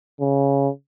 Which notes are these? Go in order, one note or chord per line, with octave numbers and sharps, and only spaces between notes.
C#3